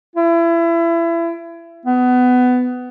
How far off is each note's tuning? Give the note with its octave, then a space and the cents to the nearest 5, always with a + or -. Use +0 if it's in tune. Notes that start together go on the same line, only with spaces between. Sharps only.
E4 +30
B3 +20